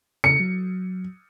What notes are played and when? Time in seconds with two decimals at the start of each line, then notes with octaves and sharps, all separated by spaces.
0.24 C#3 C#7
0.40 F#3